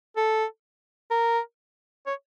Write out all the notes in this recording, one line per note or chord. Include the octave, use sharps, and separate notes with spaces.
A4
A#4
C#5